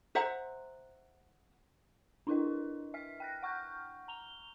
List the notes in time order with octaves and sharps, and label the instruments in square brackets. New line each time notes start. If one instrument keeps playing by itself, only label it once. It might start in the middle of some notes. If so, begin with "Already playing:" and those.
[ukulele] C5 E5 F#5 A#5
[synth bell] D4 E4 F4 A#4 B4 D#5
E5 F6 B6
G5 F#6 A#6
F#5 C#6 F6 G6
A#5 F7 G7